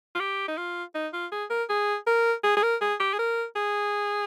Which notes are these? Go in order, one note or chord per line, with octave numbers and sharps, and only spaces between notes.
F4
G4
D#4
F4
D#4
F4
G#4
A#4
G#4
A#4
G#4
G#4
A#4
G#4
G4
G#4
A#4
G#4